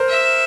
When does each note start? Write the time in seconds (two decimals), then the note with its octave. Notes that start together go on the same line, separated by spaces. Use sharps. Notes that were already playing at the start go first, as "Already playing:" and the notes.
Already playing: A#4 C5
0.09 E5